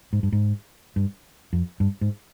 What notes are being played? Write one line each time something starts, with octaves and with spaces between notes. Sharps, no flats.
G#2
G2
G#2
G2
F2
G2
G#2